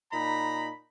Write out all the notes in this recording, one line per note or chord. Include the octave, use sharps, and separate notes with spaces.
A#2 D#4 A#5 B5